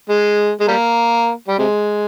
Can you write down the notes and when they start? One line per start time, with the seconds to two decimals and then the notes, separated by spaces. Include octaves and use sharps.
0.09 G#3
0.61 G#3
0.68 G3 A#3
1.48 G3
1.58 C3 G#3